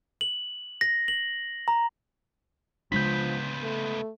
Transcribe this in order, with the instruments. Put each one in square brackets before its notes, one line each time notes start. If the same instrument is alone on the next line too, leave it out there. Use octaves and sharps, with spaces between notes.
[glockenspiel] F#7
A#6
F#7
A#5
[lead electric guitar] C#2 B3 [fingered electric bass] C#3 G#3 D4 [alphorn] F3 [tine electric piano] G6 B6
[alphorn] A3